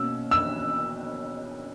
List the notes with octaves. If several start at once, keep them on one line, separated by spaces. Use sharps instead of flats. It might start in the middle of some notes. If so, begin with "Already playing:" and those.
Already playing: B2 A#3 C#4 E6
E6